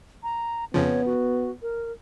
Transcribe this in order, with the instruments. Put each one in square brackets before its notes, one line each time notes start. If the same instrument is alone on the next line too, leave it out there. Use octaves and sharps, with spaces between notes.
[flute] A#5
[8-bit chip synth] F2 C#3 F3 [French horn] B3 [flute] C#5
[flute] F#4
A#4